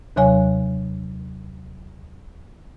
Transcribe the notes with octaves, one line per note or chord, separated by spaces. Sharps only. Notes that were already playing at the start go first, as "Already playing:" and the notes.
D#2 C3 F#3 C#5 G#5